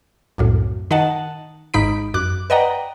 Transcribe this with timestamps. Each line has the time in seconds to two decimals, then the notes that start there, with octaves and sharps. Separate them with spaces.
0.38 C2 F#2 A2
0.91 D#3 D#4 D#5 F#5 A5
1.74 G#1 G#2 D#4 B5 B6 D7
2.14 F#2 D6 F#6
2.50 B4 D5 D#5 F#5 G5 A#5